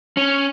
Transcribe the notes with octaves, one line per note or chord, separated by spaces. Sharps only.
C#4